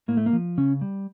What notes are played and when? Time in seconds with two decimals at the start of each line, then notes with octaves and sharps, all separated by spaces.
0.08 A2 A#3
0.17 A3
0.26 A#3
0.33 F3
0.58 C#3 C#4
0.81 G3